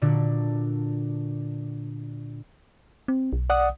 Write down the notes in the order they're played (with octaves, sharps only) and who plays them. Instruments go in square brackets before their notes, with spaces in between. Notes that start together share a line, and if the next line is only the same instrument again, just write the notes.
[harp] A#2 D3 D4 F#4
[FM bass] C4
B1
[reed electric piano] D5 F#5 D#6